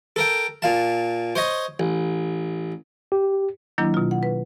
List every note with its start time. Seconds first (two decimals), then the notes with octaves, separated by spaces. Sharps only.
0.16 A4 A#4 G5
0.62 A#2 F5 A5
1.35 C5 C#5 D#5
1.80 A1
3.12 G4
3.78 D#3 F#3 A#3 D4 E4
3.94 B2 F4
4.11 F#5
4.23 B4